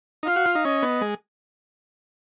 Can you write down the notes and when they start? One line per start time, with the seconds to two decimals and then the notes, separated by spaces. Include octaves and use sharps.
0.23 D#4
0.27 F4 F5
0.36 F#4
0.46 F4
0.55 D#4
0.65 C#4 D#5
0.83 B3
1.01 G#3